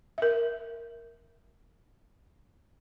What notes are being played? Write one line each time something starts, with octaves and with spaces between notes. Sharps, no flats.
A#4 E5